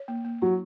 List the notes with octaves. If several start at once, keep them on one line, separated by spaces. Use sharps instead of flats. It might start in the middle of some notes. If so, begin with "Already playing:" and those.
Already playing: C#5
A#3
A#3
F#3 E4